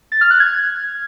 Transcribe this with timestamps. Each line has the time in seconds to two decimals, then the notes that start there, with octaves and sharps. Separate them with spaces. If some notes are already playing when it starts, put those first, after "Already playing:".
0.12 A6
0.21 F6
0.31 F#6
0.40 G#6